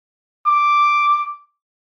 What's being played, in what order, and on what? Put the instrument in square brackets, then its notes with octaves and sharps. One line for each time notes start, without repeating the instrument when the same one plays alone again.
[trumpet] D6